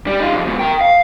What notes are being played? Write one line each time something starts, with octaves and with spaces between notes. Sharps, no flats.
G3
D#4 F4
F2
G#2 B2
A#4 G5
F5